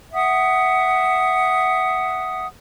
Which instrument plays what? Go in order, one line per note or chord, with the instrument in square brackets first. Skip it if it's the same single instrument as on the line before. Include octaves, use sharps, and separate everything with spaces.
[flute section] E5 F#5 D#6